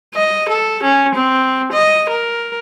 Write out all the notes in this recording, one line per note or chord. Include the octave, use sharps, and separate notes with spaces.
D#5
A4
C#4
C4
D#5
A#4